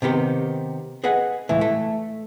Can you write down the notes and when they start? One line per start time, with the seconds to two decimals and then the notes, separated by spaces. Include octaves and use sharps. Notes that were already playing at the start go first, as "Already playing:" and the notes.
0.02 C3 D#3 B3 G4
1.04 G#4 B4 D#5 F#5
1.49 C#2 A2 E3
1.61 A3